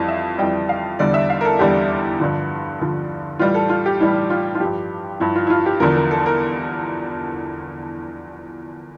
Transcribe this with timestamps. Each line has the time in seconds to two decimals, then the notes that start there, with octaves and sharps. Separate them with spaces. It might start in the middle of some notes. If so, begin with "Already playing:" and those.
Already playing: F2 E3 G3 F5
0.08 E5
0.38 F2 E3 G3 G5
0.69 F5
0.99 E2 D3 G3 D5
1.14 E5
1.30 F5
1.41 A#4
1.45 A4
1.59 E2 D3 G3 G4
2.20 G2 D3 F3
2.80 G2 D3 F3
3.39 A2 E3 G3 F4
3.54 A4
3.69 F4
3.86 G4
4.00 A2 E3 G3 E4
4.30 F4
4.55 F4
4.60 G2 F3 G4
5.20 G2 F3 E4
5.35 F4
5.47 E4
5.50 F4
5.66 G4
5.80 E2 D3 F3 A#4
5.96 A#4
6.11 A4
6.26 A#4